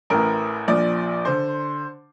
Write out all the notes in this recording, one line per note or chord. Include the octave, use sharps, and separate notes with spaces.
A1 A2 E3 A#4
A#1 A#2 F3 D5
D3 C5